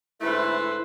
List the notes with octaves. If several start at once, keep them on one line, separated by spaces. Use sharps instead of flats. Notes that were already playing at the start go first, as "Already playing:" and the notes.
G#2 D3 A3 E4 B4 C5